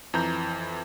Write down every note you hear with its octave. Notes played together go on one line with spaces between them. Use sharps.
F2 E3 A#5 G6